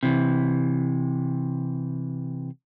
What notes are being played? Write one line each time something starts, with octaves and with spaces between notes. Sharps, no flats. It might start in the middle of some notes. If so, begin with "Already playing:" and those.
C3 E3